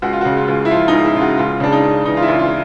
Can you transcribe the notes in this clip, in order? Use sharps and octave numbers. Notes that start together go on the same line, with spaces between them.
C#2 F#4
F4
C#3 F#4
F4
C#2
E4
F3 F4
C#2 D#4
E4
C#3 F4
F#4
C#2 F4
C#3 D4
D#4
C#2
E3 D#4
F4
E4
C#2
F4